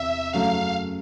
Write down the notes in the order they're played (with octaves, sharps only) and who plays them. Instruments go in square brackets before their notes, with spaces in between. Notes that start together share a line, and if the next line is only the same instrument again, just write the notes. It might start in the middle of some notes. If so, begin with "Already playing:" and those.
Already playing: [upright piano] E2 C3 [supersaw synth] E5
[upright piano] F#2 C#3 F#3 A3 [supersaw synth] F5